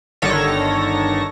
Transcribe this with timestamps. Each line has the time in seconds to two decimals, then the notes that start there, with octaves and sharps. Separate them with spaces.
0.22 G1 D3 D#3 A4 C#5 A#6